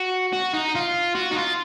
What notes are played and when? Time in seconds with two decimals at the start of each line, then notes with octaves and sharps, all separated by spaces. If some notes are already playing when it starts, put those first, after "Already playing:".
Already playing: F#4
0.33 F#4
0.54 D#4
0.75 F4
1.15 F#4
1.31 D#4
1.36 F4